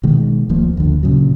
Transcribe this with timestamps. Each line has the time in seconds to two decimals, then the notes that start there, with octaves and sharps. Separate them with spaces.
0.03 B2 D#3 G#3
0.49 D1 A1 F3 A#3
0.77 D2 D3
1.03 A#2 C#3 F#3